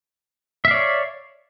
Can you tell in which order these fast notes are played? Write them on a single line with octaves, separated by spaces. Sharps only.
E5 F5 D5 C#5